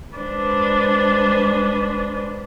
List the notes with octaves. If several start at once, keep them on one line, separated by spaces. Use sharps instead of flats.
G#3 D4 B4 C5